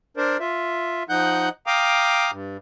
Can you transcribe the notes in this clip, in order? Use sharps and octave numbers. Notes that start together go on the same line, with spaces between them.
D4 A#4 C5 D5
F4 E5
F3 D#4 F#5 F#6 G6
F5 G5 A#5 D6 D#6
G2